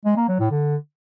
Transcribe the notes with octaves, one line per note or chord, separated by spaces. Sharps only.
G#3
A#3
F#3
A2
D3